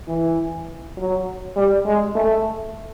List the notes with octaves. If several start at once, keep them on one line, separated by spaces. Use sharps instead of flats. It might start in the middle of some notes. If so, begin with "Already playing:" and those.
E3
F#3
G3
G#3
A3